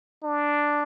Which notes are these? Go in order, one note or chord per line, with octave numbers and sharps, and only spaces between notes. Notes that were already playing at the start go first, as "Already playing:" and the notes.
D4